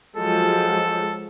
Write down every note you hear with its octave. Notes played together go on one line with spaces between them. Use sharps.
F3 F#3 G#3 A4